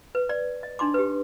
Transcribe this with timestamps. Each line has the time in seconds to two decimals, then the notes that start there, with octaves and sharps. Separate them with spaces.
0.15 B4
0.29 D5
0.63 D#5
0.79 D4 D#4 C6 D6
0.94 G4 B4